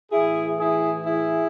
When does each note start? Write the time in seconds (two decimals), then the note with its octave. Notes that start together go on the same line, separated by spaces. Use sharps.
0.12 A2 E3 E4 G#4
0.59 E4 G#4
1.06 E4 G#4